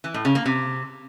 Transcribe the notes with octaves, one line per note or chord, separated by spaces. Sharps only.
E3
A2
C#3
A#3
C3